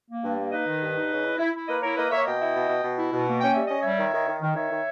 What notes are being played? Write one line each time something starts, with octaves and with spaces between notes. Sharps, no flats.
A#3
G2
A#3
D#4 B4 D#5
D#3
G2
D#4
C#3
E4
E4
E4
A#3 B4 D#5
E4 A#4 C#5
A#3 B4 D#5
A#3 C#5 E5
B2 D#5 G5
E4
B2
B2
B2
E4
B2
A#3
C#4 G5
G3 E5
C#4 D#5
G3 C#5 E5
D#3
D#3
D#3
D#3
D#3 C#5 E5
D#3